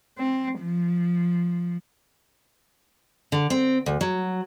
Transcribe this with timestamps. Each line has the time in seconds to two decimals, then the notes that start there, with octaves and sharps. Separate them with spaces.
0.18 C4
0.60 F3
3.32 D3
3.50 C4
3.86 D2
4.01 F#3